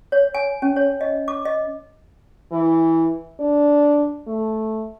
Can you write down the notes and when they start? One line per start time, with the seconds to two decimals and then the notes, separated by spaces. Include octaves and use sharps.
0.12 C#5
0.34 G#5
0.62 C#4
0.76 C#5
1.01 D#5
1.28 D6
1.45 D#5
2.52 E3
3.40 D4
4.27 A3